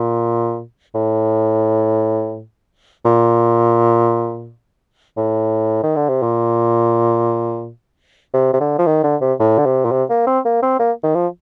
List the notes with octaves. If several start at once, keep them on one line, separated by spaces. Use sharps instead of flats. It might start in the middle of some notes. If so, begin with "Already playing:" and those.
Already playing: A#2
A2
A#2
A2
D#3
D3
C3
A#2
C3
C3
D3
F3
D#3
D3
C3
A2
D3
C3
A#2
C3
A#3
C4
A#3
C4
A#3
D#3
F3